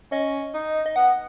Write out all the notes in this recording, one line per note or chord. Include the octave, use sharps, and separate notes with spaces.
C#4 D#5
D#4
D#5
B3 F#5